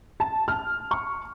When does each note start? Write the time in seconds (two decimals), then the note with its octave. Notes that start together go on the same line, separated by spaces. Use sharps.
0.20 A5
0.48 F6
0.91 C#6